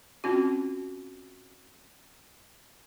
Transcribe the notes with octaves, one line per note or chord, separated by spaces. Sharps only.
C4 C#4 F4 F#4